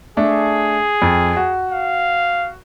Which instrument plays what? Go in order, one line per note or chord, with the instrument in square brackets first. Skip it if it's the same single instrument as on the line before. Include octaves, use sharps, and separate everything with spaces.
[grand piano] A3 D4 [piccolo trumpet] G#4
[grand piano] F2
F#4
[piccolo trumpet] F5